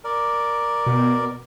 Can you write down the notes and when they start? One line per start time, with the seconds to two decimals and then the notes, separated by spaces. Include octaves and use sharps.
0.04 A#4 D5
0.86 B2